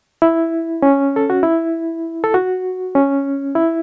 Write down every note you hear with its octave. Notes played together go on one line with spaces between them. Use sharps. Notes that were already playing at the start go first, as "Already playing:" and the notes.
E4
C#4
A4
F#4
E4
A4
F#4
C#4
E4